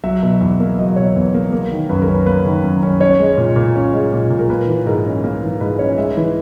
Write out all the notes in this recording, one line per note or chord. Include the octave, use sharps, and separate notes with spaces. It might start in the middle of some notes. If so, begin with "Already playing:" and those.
F#3 E5
B2
E2
A#3
F#3 D#5
B2 C#5
E2
A#3
A#3
D#3
F#2 B4
A#4
C#4
B4
A#3 B4
D#3
F#2
C#4
C#4 C#5
G#3
A#2
A#2
C#4
G#3
A#2
A#2
A#4
A#3 B4
E3
G#2 A#4
C#4
A#3
E3
G#2 B4
C#4 C#5
G#3 E5
E3